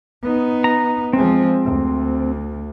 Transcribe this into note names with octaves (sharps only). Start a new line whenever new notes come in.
B3 D#4
A#5
F3 G#3 C4
D2